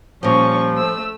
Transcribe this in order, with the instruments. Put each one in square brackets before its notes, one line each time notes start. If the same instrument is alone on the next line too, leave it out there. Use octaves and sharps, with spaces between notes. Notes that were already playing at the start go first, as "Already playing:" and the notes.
[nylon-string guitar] A#2 G3 [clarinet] F3 [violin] C#4 C#6 [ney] C5
[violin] A3 E6